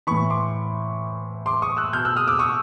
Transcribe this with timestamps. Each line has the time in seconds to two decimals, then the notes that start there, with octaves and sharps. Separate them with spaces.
0.07 A2 E3 B5 C#6
0.30 C6 D6
1.46 C6 D6
1.62 C#6 D#6
1.77 E6 F#6
1.93 B2 F6 G6
2.05 E6 F#6
2.16 D#6 F6
2.28 D6 E6
2.39 C#6 D#6